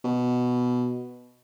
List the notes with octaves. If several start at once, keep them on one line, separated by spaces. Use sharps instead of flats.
B2